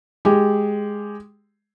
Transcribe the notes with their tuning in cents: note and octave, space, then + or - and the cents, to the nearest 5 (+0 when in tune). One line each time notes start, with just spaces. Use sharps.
G#3 +0 G4 +0